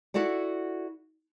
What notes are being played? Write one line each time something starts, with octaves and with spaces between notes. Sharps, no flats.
E4 F#4 A4 D5 F#5